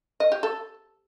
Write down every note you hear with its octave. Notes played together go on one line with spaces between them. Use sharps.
D#5
G4
A4